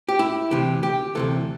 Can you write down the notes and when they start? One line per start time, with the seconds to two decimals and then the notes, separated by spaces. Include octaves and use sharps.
0.09 G4
0.19 E4
0.51 D2 C3 E3 G4
0.83 G4
1.15 D2 C3 E3 A4